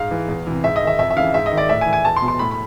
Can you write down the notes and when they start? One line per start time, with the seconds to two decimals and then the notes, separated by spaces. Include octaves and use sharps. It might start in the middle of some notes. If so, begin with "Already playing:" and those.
Already playing: G#2 F5
0.11 E3
0.28 E2
0.47 C3 E3
0.64 G#2 E5
0.76 D#5
0.82 D#3
0.87 E5
0.99 F2 E5
1.10 E5
1.16 C#3 E3 F5
1.34 G#2 E5
1.46 D#5
1.51 D#3
1.58 D5
1.69 A2 E5
1.81 G#5
1.86 E3
1.93 G#5
2.04 E2 A5
2.16 C6
2.22 B2
2.28 C6
2.39 A2 B5
2.51 B5